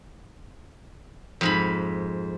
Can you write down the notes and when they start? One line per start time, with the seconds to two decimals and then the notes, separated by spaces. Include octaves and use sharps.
1.41 F2 G#2 B5